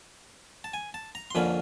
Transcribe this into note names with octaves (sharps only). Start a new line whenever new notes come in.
A5
G#5
A5
A#5
C6
F2 D3 F3 A#3 C#4 B5